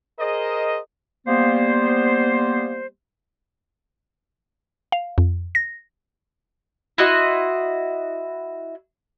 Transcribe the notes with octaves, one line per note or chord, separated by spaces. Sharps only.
G#4 A#4 C5 D#5
G3 A#3 B3 C5
F5
F2
A#6
E4 F#4 D#5 C6